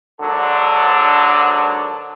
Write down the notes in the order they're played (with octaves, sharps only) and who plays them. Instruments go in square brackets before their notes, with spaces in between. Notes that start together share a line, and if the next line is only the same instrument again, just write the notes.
[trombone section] G#1 D3 F#3 D4 A4